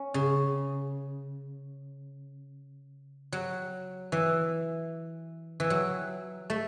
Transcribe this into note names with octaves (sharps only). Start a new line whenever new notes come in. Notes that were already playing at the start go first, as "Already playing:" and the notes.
Already playing: C#4
C#3
F#3
E3
E3
F#3
A3